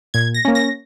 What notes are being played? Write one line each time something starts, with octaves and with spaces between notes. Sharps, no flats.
A#2 G#6
A#6
A#3 C#4
A#6